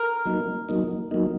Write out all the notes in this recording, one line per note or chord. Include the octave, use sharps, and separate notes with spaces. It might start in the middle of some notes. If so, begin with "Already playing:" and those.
Already playing: A#4
F#3 A#3 D#4
F#3 A#3 D#4
F#3 A#3 D#4